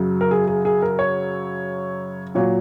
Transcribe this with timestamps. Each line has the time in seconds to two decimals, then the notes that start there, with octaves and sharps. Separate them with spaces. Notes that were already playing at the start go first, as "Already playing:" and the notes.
Already playing: F#2 C#3 F#3
0.21 A#4
0.31 G#4
0.48 G#4
0.65 G#4
0.82 A#4
0.99 C#5
2.35 A#2 F#3 C#5